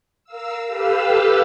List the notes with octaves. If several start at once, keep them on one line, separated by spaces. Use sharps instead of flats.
A#4 F5 E6
G4 A4 B4 F5 E6